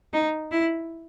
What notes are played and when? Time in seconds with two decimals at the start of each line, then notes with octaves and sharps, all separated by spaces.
0.13 D#4
0.51 E4